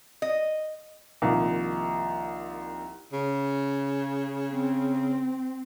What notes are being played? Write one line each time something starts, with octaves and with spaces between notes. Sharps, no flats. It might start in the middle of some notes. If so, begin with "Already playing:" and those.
D#5
C2 D#3 F3 A#3
C#3
C4